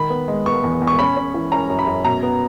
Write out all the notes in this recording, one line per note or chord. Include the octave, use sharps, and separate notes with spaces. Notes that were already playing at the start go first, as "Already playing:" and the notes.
Already playing: D#3 B5
B3
G#3
B3 C#6
E2
E2
C#6
C#4 B5
C#4
E3
C#4 A#5
F#2
B5
F#2
B2 A#5
B3